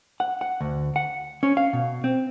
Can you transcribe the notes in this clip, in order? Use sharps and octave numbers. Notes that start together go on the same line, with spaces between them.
F#5
F#5
D2
F#5
C#4
F5
B2
C4